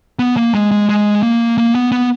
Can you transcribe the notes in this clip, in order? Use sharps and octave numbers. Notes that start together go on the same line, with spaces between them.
B3
A#3
G#3
G#3
G#3
A#3
A#3
B3
B3